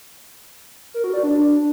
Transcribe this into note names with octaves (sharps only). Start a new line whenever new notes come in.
A#4
F#4
D5
D4